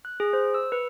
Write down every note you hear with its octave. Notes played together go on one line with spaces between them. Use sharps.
F#6
G#4
C5
E6
B4